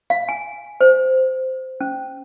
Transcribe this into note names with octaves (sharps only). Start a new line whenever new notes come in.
F5
G#5
C5
C#4